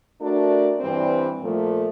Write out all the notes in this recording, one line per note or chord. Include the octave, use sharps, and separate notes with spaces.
A3 D4 F#4 A#4 D5
G2 E3 G3 C4
A#2 F3 A3